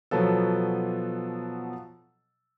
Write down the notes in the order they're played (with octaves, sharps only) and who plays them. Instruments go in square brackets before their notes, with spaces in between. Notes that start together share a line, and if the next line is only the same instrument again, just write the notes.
[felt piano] B2 F3 F#3 B3 A4